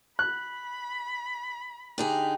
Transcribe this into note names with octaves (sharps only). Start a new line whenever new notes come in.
B5 F#6
D3 D#4 G4 G#4